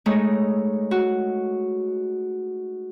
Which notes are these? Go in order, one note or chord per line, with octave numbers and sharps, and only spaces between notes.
G#3 A3 D#4 C#5
F#4